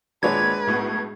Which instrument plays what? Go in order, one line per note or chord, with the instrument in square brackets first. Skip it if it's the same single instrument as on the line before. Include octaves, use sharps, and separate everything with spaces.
[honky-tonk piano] G#1 A#2 C#5 [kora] G#3 D4 [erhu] B4 [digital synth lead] G#6
[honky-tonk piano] B1 A2 B3